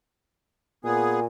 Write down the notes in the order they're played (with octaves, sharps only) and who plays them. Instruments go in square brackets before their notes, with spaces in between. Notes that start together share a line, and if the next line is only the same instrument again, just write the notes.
[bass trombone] A#2 [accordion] B3 G#4 [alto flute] G#5